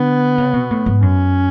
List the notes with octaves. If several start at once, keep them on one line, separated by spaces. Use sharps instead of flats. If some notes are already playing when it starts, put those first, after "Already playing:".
Already playing: D3 B3
C#3
B2
A2
G#2
F#2 C#4